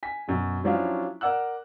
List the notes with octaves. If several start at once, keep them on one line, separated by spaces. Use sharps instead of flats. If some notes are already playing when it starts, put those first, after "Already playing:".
G#5 B6
F#2 B2
F3 F#3 C#4 D4 E4 F4
A#4 D5 F#5 E6 F#6